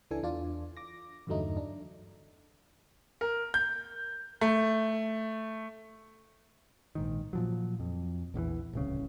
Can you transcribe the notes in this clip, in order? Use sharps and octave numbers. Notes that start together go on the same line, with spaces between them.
C#2 E3 D4 A4 G#5
E2 D4 F4 D5
D6 A#6
E2 G2 D3 F#3 A3 D#4
D4
A#4
G6
A3
A#1 G#2 D#3
A#2 F3 F#3
F2
A#1 E2 D#3 E3
D1 C2 C#3